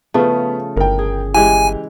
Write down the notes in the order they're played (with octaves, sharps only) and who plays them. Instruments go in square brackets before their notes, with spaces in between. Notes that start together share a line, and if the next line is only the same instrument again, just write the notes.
[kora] C#3 F3 A3 [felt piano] B3
[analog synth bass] G1 [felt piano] A#4 G5
[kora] G#4
[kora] E3 G#3 [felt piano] G4 [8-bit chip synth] G#5